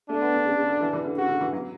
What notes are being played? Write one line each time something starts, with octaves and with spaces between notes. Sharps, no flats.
A3 D4
B3
D3
C#3
C#3
D3
E3
E3
D3
C#3 F#4
D3
E3
F#3